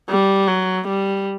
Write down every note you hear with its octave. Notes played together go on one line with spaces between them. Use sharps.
G3
F#3
G3